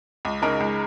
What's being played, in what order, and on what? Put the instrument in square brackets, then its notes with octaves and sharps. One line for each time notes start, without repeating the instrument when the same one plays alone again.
[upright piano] C#2
C#3 G#3 D#4 A#4
C#2